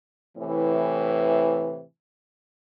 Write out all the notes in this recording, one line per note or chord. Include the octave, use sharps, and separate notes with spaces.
A2 C3 E3